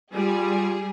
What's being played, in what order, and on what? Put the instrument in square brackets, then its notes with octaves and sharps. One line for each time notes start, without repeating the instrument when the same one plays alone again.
[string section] G3 G#4 [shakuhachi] F4